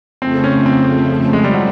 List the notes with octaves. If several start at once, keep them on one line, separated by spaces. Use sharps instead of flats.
F2 C#3 F3 A3 C4
C#4
C4
G#3
G3
F#3